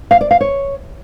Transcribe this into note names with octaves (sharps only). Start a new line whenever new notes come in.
F5
D5
F5
C#5